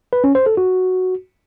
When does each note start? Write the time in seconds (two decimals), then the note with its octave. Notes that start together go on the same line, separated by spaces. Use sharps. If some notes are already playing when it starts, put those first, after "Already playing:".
0.13 B4
0.24 C#4
0.35 C5
0.46 A4
0.57 F#4